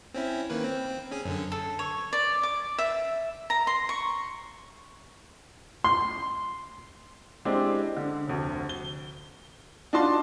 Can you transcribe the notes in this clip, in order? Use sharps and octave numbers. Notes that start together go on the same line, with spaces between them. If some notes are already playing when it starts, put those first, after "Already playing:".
C4 C#4 E4
D#3 A#3 B4
C4
C#4 G#4 G#5
F#2 D3 C#4
A4
C#5
D5
D6
E5
A#5
C6
C#6
C6
G#3 C4 D4 E4 G4
D3
F1 D2
G7
D4 D#4 F4 F#4 A5 C6